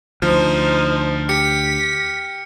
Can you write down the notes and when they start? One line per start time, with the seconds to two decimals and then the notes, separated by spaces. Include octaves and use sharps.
0.22 D2 F3 D#4 C5 F6
1.29 G4 B6 C#7